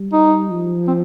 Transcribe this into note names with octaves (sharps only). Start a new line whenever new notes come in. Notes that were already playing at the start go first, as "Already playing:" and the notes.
Already playing: G3
D#4
F3
C4